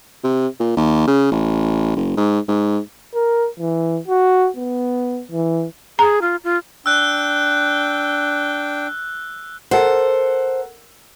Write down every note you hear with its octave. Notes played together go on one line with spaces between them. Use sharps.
C3
A#2
D#2
C#3
A1
F#1
G#2
G#2
A#4
E3
F#4
B3
E3
G#4 A#5
F4
F4
D4 G5 E6 F#6
A4 A#4 C5 F#5